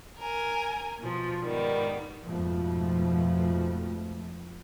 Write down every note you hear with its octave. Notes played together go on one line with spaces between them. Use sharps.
A#4 G#5
B2 F3
G#2 D#3 G3 B3
F2 G#2 B2 F3 A3